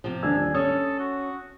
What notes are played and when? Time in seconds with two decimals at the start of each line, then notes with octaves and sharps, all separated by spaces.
0.04 C3 F3
0.23 D#1 D4 G#5 E6
0.54 C#4 A4 D#6
0.99 F#4